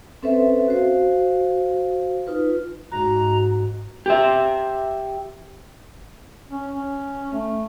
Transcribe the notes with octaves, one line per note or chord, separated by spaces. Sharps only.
C4 C#4 A4 B4 C5 E5
F#4 C5 F5
D#4 F4 B4
G#2 F#4 A#5
G4 E5
C#4
C#4
A3